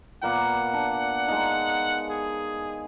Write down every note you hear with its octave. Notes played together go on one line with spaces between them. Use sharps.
A#2 A#3 B3 F#5
D4
G#3 D#4
G#4